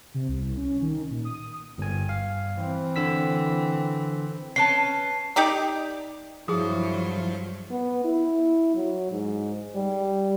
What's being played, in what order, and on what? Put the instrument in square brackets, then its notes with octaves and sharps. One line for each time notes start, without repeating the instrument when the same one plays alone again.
[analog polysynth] C3
C2
C#4
D#3
A#2
D#6
[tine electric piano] G1 G#5 [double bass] G2
[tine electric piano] F5
[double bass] E3 C4
[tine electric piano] D3 E6 B6
[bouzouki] C#4 B4 A5 [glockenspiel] C7
[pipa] D#4 G4 D5 A#5
[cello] G2 F#3 [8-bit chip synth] F3 [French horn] E4 [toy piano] G#4 D#6
[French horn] B3
E4
F#3
G#2
G3